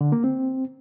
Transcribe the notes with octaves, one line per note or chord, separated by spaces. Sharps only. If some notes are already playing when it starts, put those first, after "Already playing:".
D3
A#3
C4